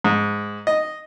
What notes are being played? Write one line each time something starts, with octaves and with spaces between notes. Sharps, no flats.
G#2
D#5